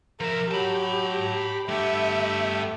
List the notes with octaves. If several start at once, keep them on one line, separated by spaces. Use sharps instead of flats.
F3 A#4 E5
F#3 G4 A5 B5
G2 A3 B3 G4 E5